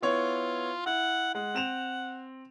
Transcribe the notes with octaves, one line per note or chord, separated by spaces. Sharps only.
B3 E4 F4 C#5
E4 F#5
G#3 F#5
C4 E7 F7